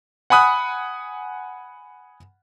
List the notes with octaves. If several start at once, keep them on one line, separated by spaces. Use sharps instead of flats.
F#5 G#5 B5 D#6 F#6